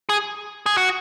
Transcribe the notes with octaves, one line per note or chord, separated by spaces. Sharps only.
G#4
G#4
F#4